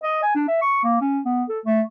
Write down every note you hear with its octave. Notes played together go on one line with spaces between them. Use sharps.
D#5
G#5
D4
E5
C#6
A#3
C#4
B3
A4
A3